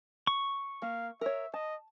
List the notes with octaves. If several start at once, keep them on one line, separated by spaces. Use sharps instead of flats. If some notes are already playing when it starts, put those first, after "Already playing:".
C#6
A#3 F5
A#4 C#5 E5
D#5 A5